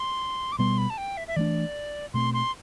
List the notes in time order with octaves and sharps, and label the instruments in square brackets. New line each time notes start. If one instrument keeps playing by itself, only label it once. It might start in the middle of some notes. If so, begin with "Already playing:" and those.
Already playing: [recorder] C6
D6
[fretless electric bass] B2 G3 B3 [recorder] C6
[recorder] B5
A5
G5
E5
E5
[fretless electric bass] E3 A3 D4 [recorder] D5
[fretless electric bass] B2 A3 C4 [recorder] C6
[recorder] C6